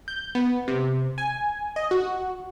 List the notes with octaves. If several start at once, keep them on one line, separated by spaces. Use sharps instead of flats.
G6
B3
C3
G#5
D#5
F#4